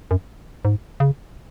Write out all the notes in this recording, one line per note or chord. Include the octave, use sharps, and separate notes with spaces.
F#2
G#2
C#3